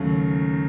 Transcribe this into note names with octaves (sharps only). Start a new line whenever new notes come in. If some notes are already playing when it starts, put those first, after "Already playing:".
Already playing: D#2 C#3 F#3 A3